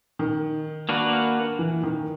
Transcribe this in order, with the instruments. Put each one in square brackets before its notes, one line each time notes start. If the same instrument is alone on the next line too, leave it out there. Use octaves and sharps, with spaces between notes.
[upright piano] D#3
[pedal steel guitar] A#3 D4 F#4 B4
[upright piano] E3
D#3